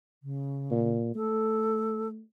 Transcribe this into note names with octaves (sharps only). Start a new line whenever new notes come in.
C#3
A#2
A3 A4